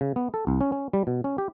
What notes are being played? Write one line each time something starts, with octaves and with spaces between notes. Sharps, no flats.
C#3
B3
A4
C2
C#4
C#4
G3
B2
C#4
G4